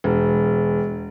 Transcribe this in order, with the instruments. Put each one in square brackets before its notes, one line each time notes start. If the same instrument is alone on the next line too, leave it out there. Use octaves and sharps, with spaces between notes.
[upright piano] E1